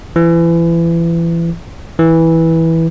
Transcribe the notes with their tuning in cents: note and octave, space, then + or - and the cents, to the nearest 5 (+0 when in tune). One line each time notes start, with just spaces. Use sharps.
E3 +30
E3 -10